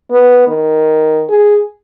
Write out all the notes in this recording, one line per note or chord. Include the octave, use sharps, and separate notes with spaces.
B3
D#3
G#4